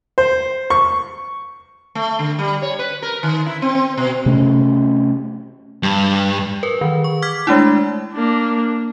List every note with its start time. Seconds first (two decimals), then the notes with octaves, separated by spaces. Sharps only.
0.18 C5
0.70 C#6
1.95 A3
2.19 D3
2.39 G3
2.62 C#5
2.79 B4
3.02 A#4
3.23 D#3
3.46 E4
3.62 C4
3.75 C4
3.97 B2
4.26 C3 A3 C#4
5.83 G2
6.63 A#4 B4
6.81 D#3 E3
7.04 C#6
7.22 D6 F6 G#6 B6
7.47 G#3 A3 D4 E4
8.13 A#3 D4